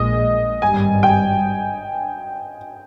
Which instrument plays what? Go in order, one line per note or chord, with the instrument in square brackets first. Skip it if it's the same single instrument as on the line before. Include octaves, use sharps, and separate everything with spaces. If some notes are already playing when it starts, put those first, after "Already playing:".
Already playing: [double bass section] A#1 A#2 G#3 [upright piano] D#5
[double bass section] G#1 G2 G3 [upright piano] G#5
[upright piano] G5
G#5